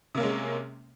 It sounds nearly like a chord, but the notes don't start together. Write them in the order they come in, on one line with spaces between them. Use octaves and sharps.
C3 A#3 C#4 G#3